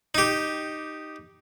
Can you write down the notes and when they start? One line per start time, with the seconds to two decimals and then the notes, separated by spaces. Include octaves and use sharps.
0.15 D#4 G4